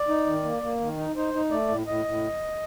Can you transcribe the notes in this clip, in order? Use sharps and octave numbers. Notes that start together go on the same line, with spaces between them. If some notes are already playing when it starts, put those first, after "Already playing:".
Already playing: D5
D#4
D#3
A#3
A#3
D#3
D#4
D#4 C5
D#4
A3 D5
A2
A2 D#5
A2